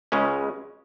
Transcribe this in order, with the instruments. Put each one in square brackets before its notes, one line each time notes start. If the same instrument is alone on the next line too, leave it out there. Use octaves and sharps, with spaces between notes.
[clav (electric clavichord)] C#2 C#3 G#3 C#4